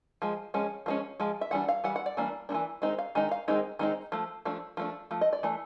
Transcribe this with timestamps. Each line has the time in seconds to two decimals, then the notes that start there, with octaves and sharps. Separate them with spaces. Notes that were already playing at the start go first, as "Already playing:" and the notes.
0.22 F3 G#3
0.54 F3 G#3 C#4
0.86 F3 G#3 C#4
1.20 F3 G#3
1.41 E5
1.51 E3 G3 D4 F#5
1.69 F5
1.84 E3 G3 F#5
1.96 F#5
2.06 D5
2.17 E3 G3 A#3 D4
2.49 G3 A#3 D4
2.54 E3
2.82 D#3 G#3 C4 D#4
2.98 F5
3.15 D#3 G#3 D#4
3.31 F5
3.48 D#3 G#3 C4 D#4
3.79 D#3 G#3 C4 D#4
4.12 F3 A3
4.45 F3 A3 D4
4.77 F3 A3 D4
5.11 F3 A3
5.21 D#5
5.33 D5
5.43 E3 A3